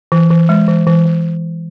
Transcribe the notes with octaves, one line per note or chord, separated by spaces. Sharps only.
E3
E3
G#3
E3
E3
E3